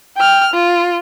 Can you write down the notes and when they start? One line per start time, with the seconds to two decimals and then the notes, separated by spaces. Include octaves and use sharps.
0.17 G5 F6
0.54 F4